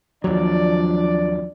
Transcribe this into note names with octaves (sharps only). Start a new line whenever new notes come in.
D#2 F3 F#3 D4 D5